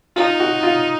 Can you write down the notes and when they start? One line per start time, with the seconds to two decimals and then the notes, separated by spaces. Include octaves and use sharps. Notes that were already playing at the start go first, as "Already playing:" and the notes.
0.16 D#4 F4
0.40 F#4
0.63 F4